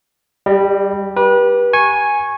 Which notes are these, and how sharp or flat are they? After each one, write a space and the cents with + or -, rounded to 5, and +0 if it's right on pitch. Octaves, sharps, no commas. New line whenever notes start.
G3 +0 G4 +45 D#5 -40
G4 +0 B4 -30
G#5 +0 C#6 -15